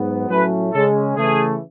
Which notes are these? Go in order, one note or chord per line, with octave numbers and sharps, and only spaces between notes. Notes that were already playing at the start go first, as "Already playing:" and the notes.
Already playing: G#2 F#3 B3
A2 F#3 A3 C#4 B4
C#3 G#3 C#4 A4
C#3 E3 A3 G#4